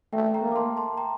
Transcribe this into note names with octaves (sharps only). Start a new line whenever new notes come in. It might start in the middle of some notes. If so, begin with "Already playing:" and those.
A3 E5 G5
G5 A#5
A#3
D6
A5 C6
A5 C6
G5 A#5